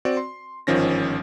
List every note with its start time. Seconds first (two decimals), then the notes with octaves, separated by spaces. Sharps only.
0.05 C4 F#4 D5
0.17 C6
0.67 G1 G#2 D#3 F3 C#4 A#6